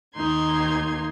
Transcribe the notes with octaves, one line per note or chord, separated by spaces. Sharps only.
D#2 A#3 D#4 C6 G#6